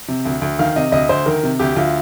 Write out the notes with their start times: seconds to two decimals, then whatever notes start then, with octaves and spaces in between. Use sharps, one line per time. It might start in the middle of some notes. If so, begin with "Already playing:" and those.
0.08 C3
0.25 D2
0.42 D2
0.59 D#3 F5
0.76 C3 D#5
0.92 D2 D#5
1.09 D2 C5
1.26 D#3 A#4
1.43 C3
1.59 D2 G4
1.76 D2 F4